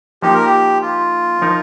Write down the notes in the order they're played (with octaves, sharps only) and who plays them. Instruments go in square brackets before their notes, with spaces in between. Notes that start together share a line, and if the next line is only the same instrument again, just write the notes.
[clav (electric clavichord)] F3 A#3 D#4 [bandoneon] G4
[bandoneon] A#4
G4
F4
[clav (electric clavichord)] F3 D#4 A#4